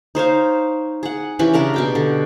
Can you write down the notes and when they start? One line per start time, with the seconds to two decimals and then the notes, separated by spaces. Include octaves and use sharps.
0.15 D#4 C5 C#5 F5
1.03 G#4 F#5
1.39 E3 C#4 G4 B4
1.54 C#3 D4 A#4 A#5
1.74 B2 G4 G5
1.95 D3